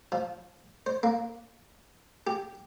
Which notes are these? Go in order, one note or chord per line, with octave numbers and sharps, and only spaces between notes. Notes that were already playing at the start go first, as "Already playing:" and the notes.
F3
C5
A#3
G4